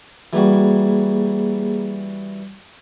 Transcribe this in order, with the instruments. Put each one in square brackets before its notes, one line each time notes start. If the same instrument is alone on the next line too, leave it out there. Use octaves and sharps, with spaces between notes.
[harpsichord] E3 G3 F#4 [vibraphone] A#3 G#4